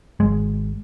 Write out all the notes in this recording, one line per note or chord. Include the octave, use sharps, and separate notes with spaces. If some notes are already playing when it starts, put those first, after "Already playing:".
G#1 G#3